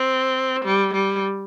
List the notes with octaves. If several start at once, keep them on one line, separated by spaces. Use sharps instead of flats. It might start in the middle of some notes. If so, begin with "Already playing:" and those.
Already playing: C4
G3
G3